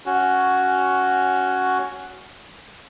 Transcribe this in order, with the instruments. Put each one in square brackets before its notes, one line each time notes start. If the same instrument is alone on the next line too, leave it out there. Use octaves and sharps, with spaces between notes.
[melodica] C#4 F#4